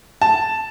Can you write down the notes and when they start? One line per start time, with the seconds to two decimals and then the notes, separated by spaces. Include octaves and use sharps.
0.22 A5